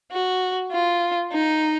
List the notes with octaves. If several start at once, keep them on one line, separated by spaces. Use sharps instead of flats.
F#4
F4
D#4